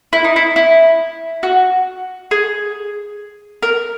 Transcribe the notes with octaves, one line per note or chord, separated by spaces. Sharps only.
E4
D#4
E4
E4
F#4
G#4
A#4